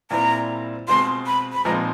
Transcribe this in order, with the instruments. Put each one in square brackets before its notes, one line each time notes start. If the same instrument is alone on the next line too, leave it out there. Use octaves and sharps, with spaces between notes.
[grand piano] A#2 G3 C4 E4 [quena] A#5
[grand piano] B2 G#3 C4 F4 [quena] C6
[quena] B5
B5
[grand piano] A#2 F3 G#3 C4 D#4 [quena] A#5